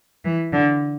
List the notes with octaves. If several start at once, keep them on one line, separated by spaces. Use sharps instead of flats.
E3
D3